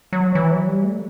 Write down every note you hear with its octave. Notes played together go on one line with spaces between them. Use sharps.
F#3
E3
F#3
G3
A3